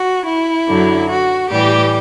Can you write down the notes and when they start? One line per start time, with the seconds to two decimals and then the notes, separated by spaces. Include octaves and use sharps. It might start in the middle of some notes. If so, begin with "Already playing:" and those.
Already playing: F#4
0.26 E4
0.68 F#2 D3 F#3
1.10 F#4
1.51 A2 E3 G3 G4